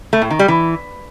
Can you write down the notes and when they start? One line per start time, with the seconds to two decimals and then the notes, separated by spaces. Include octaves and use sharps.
0.13 A3
0.22 A2
0.31 D#3
0.39 G3
0.48 E3